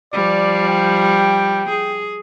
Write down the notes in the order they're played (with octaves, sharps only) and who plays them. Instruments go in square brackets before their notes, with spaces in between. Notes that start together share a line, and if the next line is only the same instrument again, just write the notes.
[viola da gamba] F3 G3 [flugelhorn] D5
[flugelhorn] G5
[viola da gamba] G#4